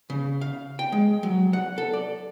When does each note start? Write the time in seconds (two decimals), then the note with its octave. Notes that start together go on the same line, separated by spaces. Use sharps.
0.10 C#3
0.41 F5
0.79 G5
0.92 G#3
1.23 F#3
1.53 F#5
1.78 A4
1.94 D5